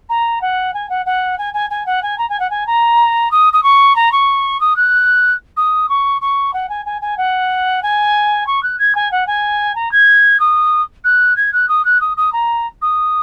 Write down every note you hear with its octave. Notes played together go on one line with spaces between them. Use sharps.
A#5
F#5
G#5
F#5
F#5
G#5
G#5
G#5
F#5
G#5
A#5
G#5
F#5
G#5
A#5
D#6
D#6
C#6
A#5
C#6
D#6
F#6
D#6
C#6
C#6
F#5
G#5
G#5
G#5
F#5
G#5
C#6
F#6
G#6
G#5
F#5
G#5
A#5
G#6
D#6
F#6
G#6
F#6
D#6
F#6
D#6
D#6
A#5
D#6